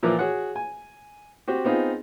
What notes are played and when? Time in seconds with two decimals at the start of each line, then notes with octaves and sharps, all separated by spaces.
0.03 A#2 E3 F3 A#4 B4 D6
0.19 F#4 G#4 C#5 F#5
0.56 G#5
1.48 C4 F#4 G4
1.65 B3 C4 D#4 F4 G#4